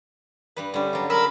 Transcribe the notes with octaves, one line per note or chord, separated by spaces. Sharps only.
G2 G3 B4
D3 G3 C#4
F#3 F4
G#4 A#4 A5 B5 E6